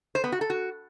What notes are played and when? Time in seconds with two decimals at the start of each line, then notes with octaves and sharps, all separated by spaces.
0.15 C5
0.24 B3
0.32 F#4
0.41 A4
0.50 F#4